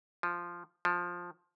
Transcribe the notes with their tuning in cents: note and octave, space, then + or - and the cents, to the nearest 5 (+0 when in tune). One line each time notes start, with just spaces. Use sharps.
F3 -5
F3 +10